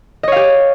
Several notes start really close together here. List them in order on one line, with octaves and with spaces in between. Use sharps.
D#5 C#5 F5 G4